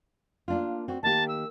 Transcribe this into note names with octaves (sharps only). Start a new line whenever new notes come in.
A#3 D4 F4
C4 F#4
D#3 A#3 G4 A5
E6